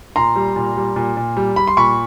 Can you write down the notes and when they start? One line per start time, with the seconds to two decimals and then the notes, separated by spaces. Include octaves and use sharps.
0.16 A#2 A#5 C6
0.36 G3
0.56 A#2
0.77 G3
0.96 A#2
1.17 A#2
1.37 G3
1.56 G3 B5
1.67 C6
1.77 A#2 B5 C#6